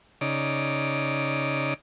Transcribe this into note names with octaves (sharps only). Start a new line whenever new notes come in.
C#3 D#4 D5